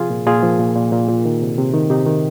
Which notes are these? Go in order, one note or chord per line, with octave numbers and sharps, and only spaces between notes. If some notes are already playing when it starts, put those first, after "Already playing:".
Already playing: C3 F3 F4 G#4
A#2
A#2 F4 G#4
F3
A#2
A#2
A#2
A#2
D#3
C3
C3
D#3
C3 D#4 G4
D#3